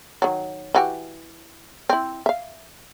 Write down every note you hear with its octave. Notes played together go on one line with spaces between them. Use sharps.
D#3 F#3
E3 F#4 G4
C4 E4
E5 F5